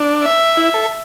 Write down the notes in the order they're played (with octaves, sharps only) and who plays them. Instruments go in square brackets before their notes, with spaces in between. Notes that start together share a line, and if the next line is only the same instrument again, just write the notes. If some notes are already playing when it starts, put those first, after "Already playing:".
Already playing: [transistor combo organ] D4
[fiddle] E5
[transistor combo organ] E4
A4